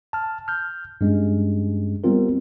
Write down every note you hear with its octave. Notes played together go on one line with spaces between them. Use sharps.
A5 F6
F6 G6
G2 G#3 C#4
G3 B3 C4 F4 A#4